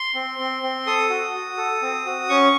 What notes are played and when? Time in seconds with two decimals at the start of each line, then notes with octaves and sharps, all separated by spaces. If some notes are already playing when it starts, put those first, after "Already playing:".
Already playing: C6
0.15 C4
0.39 C4
0.63 C4
0.86 A4 D#6
1.10 F#4
1.35 F#4
1.57 A4
1.82 C4
2.06 F#4
2.29 C#4 C#6